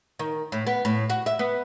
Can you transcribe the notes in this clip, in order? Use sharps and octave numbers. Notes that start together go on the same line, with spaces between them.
D#3
A2
B3
A2
F#4
E5
B3